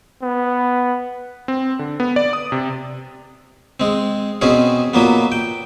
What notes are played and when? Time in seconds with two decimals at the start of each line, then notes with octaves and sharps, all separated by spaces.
0.22 B3
1.48 C4
1.79 D3
2.00 B3
2.16 D5
2.33 D#6
2.52 C3
3.80 G#3 C4
4.41 B2 C4 C#4 G#4
4.94 A#2 F#3 A#3 B3
5.32 G5